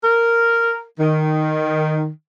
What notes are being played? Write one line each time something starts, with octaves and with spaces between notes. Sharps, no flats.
A#4
D#3